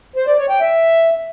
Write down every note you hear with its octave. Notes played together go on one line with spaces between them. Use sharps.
C5
D5
C#5
G5
E5